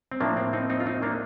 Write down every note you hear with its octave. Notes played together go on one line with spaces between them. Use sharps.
C4
A2 F3 A#3 D4
C4
C4 D#4
C4 D#4
F4
C4 D#4
A#3 D4